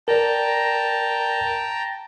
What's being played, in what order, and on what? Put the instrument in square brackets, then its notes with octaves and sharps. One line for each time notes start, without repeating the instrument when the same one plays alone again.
[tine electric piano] A#4 D5 [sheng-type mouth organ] G5 A5 A#5